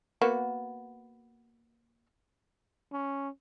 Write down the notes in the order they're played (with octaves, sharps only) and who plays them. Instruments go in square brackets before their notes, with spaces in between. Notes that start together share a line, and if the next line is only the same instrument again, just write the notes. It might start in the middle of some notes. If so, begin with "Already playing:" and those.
[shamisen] A#3 B3 F#4
[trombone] C#4